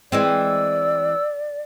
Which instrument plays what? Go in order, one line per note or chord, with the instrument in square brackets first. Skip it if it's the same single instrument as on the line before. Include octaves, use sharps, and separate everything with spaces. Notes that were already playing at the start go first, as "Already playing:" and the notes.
[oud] E3 G#3 C4 [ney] D5 [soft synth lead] E6